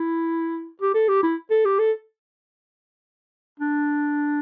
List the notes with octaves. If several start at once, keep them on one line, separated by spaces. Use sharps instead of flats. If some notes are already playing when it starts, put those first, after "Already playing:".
Already playing: E4
G4
A4
G4
E4
A4
G4
A4
D4